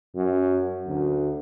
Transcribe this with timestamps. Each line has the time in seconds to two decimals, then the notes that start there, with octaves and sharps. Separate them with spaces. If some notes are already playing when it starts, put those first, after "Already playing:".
0.16 F#2
0.87 D2